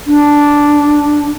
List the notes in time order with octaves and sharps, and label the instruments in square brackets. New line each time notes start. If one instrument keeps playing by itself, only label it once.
[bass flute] D4